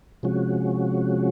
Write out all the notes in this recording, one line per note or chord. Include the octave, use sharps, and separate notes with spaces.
C3 F3 G#3 C#4 F#4